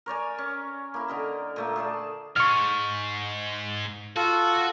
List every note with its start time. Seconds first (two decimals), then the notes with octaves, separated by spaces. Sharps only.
0.06 A#4 C#5 D5 G#5
0.38 C#4
0.94 A#3 E4
1.08 D3 A#4 D#5
1.56 A#2 A3 A#3
1.76 G#4 A4 D5 A5
2.36 G#2 C#6 F6
4.16 F4 F#4 A4